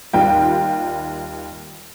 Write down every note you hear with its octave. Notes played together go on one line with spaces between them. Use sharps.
D#2 G3 F4 G5